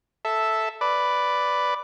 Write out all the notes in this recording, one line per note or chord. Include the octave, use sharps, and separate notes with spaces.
A4 E5
B4 D5